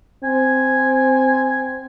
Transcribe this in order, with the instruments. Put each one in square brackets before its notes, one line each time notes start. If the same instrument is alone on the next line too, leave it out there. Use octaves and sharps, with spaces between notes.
[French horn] C4 [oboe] G#5